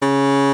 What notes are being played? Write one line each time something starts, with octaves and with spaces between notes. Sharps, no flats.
C#3